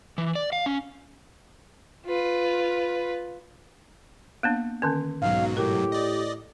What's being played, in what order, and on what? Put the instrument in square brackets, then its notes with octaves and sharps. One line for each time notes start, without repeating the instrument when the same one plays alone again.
[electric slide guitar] E3
D5
F5
C#4
[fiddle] F4 B4
[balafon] A#3 B3 D4
D3 D#3 C#4
[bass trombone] B1 [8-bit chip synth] G#2 B2 F#3 [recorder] F5
[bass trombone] A2 [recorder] G4 [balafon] A#4
[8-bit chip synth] D5 D#5